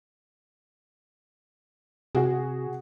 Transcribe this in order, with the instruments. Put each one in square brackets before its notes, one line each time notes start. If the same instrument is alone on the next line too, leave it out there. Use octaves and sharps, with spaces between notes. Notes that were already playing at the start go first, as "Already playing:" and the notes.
[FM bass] C3 [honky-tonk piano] F#4 G#4